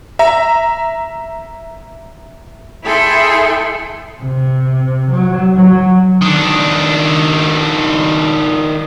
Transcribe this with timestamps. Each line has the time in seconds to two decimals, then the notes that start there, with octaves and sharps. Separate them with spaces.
0.19 E5 A#5
2.83 E4 G#4 A4 G5 A5 C6
4.22 C3
5.11 F#3
5.56 F#3
6.22 D#3 D4